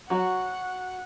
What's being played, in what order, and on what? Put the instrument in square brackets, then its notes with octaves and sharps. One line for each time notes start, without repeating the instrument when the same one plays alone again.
[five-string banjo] F#3 F#4 [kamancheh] F#5